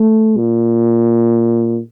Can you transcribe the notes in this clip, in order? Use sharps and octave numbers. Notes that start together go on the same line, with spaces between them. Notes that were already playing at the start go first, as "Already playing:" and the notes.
Already playing: A3
A#2